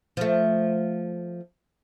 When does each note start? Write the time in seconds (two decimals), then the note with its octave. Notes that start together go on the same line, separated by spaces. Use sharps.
0.17 F3 A3